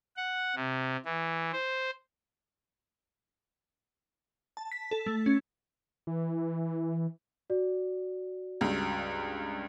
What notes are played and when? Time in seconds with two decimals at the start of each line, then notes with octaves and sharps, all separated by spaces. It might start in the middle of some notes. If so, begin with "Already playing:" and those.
0.17 F#5
0.55 C3
1.05 E3
1.52 C5
4.57 A5
4.72 B6
4.91 A4
5.06 A3
5.26 C#4
6.07 E3
7.50 F#4 D5
8.61 C#2 G2